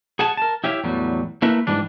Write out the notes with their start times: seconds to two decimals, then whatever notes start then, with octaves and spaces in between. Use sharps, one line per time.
0.19 G#4 F#5 G#5 A5
0.37 A#4 A5
0.64 E4 G4 C#5 E5 F5
0.84 E2 A2 F#3 G3
1.42 A3 A#3 E4 A#4 B4 E5
1.67 G#2 E3 G3 D4